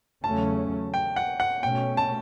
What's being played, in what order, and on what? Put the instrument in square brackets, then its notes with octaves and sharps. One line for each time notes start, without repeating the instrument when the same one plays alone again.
[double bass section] E2 C#3 F#3 A3 C#4 [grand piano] A5
[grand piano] G5
F#5
F#5
[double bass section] B2 A3 C#4 [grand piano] G5
[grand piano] A5